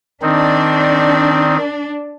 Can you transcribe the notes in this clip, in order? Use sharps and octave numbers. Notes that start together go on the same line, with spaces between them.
D#3 C4 D4 D#4